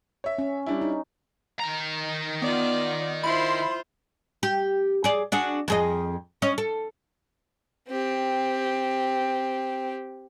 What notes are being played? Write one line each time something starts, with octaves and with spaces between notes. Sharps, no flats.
C#5 E5
C#4
G3 D4 E4
D#4
D#3 A#5
B3 F4 D5
E4 F4 C5 B5 C6
G4
G#4 D5
D4 F#4 G#4
F2 G#4 D#5
C#4 D#5
A4
C4 G4